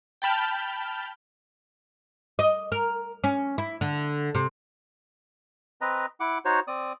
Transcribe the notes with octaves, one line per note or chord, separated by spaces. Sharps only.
G5 A5 B5 F6 G6
D#5
A#4
C#4
E4
D3
C3
C4 B4 D#5 A#5
E4 F#5 D6
D#4 F#4 C5 C#5
C4 D5 D#6